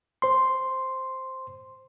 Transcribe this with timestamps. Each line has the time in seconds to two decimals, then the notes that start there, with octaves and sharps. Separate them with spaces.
0.22 C5 C6